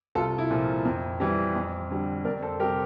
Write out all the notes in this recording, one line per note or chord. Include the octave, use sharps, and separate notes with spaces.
C2 F4 A4
E4
A#2 F3
F2
E3 G3
F2
D3 G3
F2 A#4 D5
A4 C5
C3 G3 G4 A#4